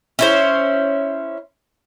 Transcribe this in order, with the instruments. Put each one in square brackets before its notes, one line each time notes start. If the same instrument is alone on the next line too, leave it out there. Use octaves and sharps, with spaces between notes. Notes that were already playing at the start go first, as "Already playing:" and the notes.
[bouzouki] C#4 E4 C5